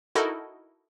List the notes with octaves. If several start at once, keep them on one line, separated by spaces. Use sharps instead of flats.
D#4 E4 F#4 A4 A#4 D#5